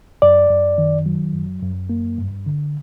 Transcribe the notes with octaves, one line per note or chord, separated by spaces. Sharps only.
F#2 D5
F#2
D#3
F#3
F#2
F#2
A#3
G2
D3